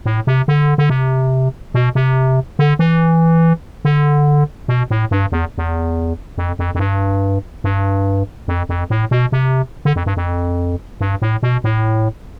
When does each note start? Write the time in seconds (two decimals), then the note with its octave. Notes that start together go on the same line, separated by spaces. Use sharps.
0.06 A2
0.27 C3
0.48 D3
0.78 D3
0.90 C3
1.74 B2
1.95 C3
2.59 D3
2.79 E3
3.85 D3
4.68 B2
4.91 A2
5.11 G2
5.32 E2
5.58 E2
6.38 F2
6.59 F2
6.75 F2
6.79 G2
7.64 G2
8.48 F2
8.69 F2
8.90 A2
9.11 B2
9.32 C3
9.85 D3
9.96 F2
10.06 G2
10.17 F2
11.01 G2
11.22 A2
11.43 B2
11.64 A2